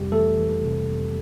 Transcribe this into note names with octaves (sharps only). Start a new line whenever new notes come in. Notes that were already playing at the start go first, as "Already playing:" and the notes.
Already playing: F2 C3 G3 G4
E3 A3 A4
E3
C3
F2